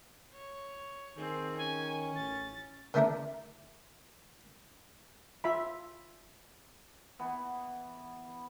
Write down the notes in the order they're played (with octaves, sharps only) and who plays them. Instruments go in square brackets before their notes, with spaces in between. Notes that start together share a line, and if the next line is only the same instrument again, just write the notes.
[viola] C#5
[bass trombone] D#3 [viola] C4 G#4
[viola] C#4 [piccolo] G#5
[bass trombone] A1 [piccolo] A6
[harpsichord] D3 D#3 A3 D4 E4 A#4
[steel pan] F4 E5 B5
[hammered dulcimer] E3 B3